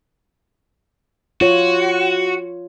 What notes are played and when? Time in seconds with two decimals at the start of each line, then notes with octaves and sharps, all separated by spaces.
1.41 F4 F#4 C#5